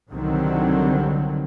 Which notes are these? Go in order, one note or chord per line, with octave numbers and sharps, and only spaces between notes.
C2 D3 D#3 F#3 G3 C4